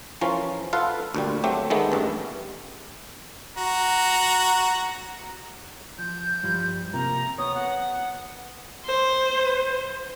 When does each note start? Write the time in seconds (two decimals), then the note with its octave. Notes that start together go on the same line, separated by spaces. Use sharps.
0.21 E3 F3 C#4 F4 A#4
0.73 F4 A4 B4 F5 F#5
1.15 D2 A#2 G3
1.44 F#3 A3 C4 G4
1.70 D#3 G#3 A3 B3
1.92 A1 G2
3.57 F#4 A#5
5.99 F3 G6
6.43 G2 F3 G3
6.93 C3 A#3 F4 A#5
7.38 B3 C#5 D#6
7.55 F#5
8.85 C5